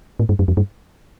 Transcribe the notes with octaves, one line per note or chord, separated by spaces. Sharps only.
A2
G2
F#2
F2
G2